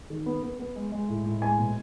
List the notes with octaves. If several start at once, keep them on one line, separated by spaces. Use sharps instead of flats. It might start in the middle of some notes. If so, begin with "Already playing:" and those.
D#3
B3
B3
B3
G#3
G#3
A2
A2
G#3 G#5
B2